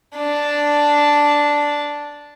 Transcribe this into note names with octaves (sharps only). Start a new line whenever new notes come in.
D4 A5